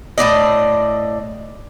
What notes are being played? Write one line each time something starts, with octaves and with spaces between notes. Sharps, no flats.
A2 C#3 D5 D#5